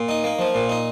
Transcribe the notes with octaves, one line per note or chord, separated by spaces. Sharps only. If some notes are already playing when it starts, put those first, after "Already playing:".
Already playing: A#2
D#4
A#3
F3
A#2
D#4